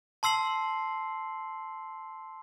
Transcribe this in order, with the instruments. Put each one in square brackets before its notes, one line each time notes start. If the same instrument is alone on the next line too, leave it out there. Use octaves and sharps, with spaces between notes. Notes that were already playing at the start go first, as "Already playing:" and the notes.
[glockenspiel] A5 C6 E6 C7 F#7